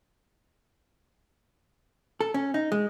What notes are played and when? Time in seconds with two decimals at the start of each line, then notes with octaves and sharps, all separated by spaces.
2.21 A4
2.34 C#4
2.54 D#4
2.72 G#3